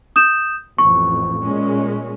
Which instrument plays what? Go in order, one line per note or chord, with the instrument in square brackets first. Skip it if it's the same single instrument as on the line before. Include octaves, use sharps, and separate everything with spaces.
[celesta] D#6 G6 E7
[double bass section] A1 F2 [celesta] C#6
[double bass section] A#2 G#3 C#4